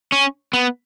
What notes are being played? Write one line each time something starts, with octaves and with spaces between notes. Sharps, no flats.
C#4
B3